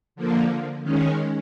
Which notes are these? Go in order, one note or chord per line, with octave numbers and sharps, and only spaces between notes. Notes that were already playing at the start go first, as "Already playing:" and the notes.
D3 F3 A#3
D#3 G#3 C#4